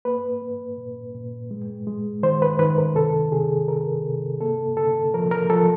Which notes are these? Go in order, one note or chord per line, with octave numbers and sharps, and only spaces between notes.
A#3 B4
A#3
A#2
A#2
G#3
G#3
D#3 C5
B4
D#3 B4
A#4
C3 A4
C3 G#4
C3 A#4
C3
A#3 A4
D3 A4
F3 A#4
A#4
F3 A4